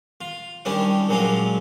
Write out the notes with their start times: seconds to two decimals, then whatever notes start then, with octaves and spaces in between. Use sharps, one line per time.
0.21 F4
0.65 D#3 G3 C#4 D4 E4
1.09 A#2 F#3 G#3 C#4 F4